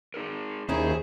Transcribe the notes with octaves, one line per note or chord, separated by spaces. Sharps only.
D#4 G#4 A#4
D#2 D#3 C#4 E4 G#4 C5